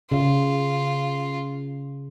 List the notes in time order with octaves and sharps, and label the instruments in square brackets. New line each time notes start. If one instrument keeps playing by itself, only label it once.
[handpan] C#3 [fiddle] F4